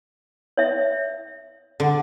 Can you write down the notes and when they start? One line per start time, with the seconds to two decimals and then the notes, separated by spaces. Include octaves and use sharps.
0.57 C#5 E5
1.80 D3